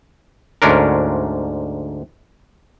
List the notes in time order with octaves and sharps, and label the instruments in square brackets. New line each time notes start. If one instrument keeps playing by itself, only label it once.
[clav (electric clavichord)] D2 G#2 C#4 D4 A#4